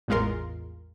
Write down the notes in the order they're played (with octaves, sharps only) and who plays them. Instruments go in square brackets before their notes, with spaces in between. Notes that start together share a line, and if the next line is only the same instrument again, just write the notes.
[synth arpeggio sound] A1 E2 G#3 F4 A#4 C6